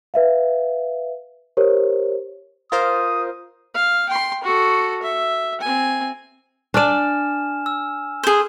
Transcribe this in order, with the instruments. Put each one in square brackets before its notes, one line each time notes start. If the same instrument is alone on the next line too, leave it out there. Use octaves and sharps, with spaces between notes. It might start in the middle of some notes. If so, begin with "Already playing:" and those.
[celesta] B4 E5 F5
G4 A#4 C5 C#5
[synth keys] F4 A#4 C5 [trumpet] D#6
[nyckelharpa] F5
G5 C6
F#4 A4
E5
C4 G#5
[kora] D4 D5 [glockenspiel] G#5 F6 E7
[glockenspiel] E6
[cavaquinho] G#4 C5